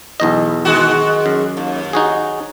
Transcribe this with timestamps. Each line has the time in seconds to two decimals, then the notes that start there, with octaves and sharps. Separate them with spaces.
0.20 B1 E2 D#5
0.65 D#3 G#3 F#4
1.26 F#2
1.57 D#2
1.93 D#4 F#4 G#4